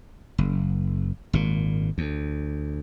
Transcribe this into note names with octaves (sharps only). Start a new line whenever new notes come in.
F#1
G#1 A#2
D2